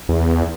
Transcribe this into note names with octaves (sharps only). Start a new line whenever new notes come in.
E2